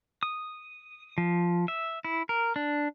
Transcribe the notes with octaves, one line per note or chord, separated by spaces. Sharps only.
D#6
F3
E5
E4
A#4
D4